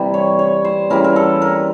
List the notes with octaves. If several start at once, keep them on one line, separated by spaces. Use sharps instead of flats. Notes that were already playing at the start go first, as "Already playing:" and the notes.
Already playing: C3 E3 G3
C#5
C#5
C5
C#3 E3 G3 A#4
A#4
A4
A#4